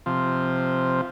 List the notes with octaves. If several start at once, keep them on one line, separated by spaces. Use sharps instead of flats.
C3 F3